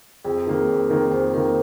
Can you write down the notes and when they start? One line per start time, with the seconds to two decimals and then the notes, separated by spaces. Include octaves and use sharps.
0.24 F2 G#4
0.47 D#3 A#3
0.68 F2
0.90 D#3 A#3
1.11 F2 C5
1.34 D#3 A#3 A#4